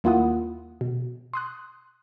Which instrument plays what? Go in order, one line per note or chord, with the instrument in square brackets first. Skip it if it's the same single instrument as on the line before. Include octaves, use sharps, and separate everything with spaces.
[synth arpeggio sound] D#2 A#3 E4 F4 F#5 D#6
B2
C6 D#6 F#6